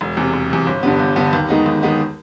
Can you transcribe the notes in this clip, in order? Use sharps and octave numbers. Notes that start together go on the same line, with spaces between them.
E1
E2 C3
E1
E2 C3
G1
G2 D3 G3 B3
G1
G2 D3 G3 B3
D#2
D#3 G#3 B3 D#4
D#2
D#3 G#3 B3 D#4